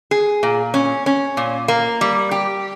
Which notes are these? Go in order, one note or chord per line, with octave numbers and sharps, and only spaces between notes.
G#4
A#2
C#4
C#4
A#2
A#3
G3
G4